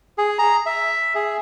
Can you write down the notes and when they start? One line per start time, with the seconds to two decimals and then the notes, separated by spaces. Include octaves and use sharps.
0.18 G#4
0.39 A#5
0.66 E5
1.15 G#4